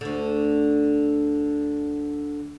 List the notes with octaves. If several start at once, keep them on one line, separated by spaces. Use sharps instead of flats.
D2 D3